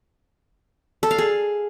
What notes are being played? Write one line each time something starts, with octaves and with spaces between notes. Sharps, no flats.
A4
F5
G#4